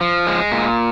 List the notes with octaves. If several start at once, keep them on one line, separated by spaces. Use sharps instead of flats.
F3
G#3
A#2